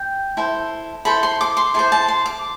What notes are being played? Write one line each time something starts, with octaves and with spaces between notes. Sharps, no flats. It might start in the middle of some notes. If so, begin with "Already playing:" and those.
Already playing: G5
E4 A4 C5
E4 A4 C5 B5
C6
D6
C6
E4 A4 C5 C6
A5
C6
D6